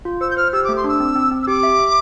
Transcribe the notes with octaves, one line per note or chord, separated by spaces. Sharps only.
F4
C5 E6
G6
C5 F6
G4 E6
D6
A3
C6
D4 E6
C4
C4
C4
E6
G4 D6
E5
E5